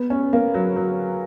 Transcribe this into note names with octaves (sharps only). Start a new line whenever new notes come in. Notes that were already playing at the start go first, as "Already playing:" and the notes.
Already playing: B3
C#4
A#3
F#3
F#3